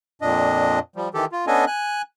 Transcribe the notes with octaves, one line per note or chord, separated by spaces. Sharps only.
F2 A#2 D4 D#5
F3 G3
D#3 E3 G4 A4
F4
B3 C#4 D4 A4 D#5 G#5
G#5 F#6